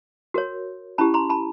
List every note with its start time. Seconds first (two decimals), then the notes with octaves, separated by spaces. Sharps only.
0.34 F#4 A#4 C#5
0.98 C#4 E4 G4 A5 B5
1.14 A#5 C6
1.30 A5 B5